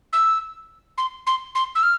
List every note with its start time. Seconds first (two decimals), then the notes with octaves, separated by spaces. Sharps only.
0.13 E6
0.98 C6
1.27 C6
1.55 C6
1.75 E6
1.83 F6